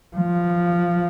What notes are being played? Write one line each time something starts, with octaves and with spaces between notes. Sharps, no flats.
F3